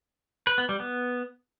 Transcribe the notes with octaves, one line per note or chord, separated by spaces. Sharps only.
B4
B3
G3
B3